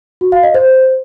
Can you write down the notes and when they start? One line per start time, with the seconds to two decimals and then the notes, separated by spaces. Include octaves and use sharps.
0.21 F#4
0.32 F5
0.43 D#5
0.54 C5